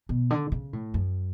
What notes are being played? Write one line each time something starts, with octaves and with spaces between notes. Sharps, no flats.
B2
D3
C#3
A2
F#2